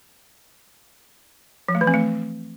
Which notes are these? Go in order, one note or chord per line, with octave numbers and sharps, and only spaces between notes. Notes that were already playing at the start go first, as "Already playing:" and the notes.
F3
A3
E3
C4
A3